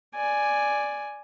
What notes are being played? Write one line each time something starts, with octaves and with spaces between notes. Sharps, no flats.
D5 G#5